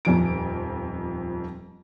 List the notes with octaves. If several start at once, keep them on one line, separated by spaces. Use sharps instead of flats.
D#1 F2 F3 D7